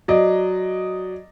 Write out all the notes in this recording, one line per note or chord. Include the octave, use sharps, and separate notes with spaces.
F#3 D5 D#5